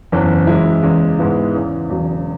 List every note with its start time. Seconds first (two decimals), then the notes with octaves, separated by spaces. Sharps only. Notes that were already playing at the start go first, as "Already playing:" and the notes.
0.12 F#1 E2 E3 C#4
0.47 F#2 E3 G#3 E4
0.83 E2 C#3 G#3
1.19 G#2 G#3 B3 E4
1.55 E2 C#3 E3
1.89 E1 E2 C#3 F#3